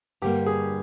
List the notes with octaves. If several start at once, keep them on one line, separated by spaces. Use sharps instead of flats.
G2 D3 G3 A#3 G4
G#4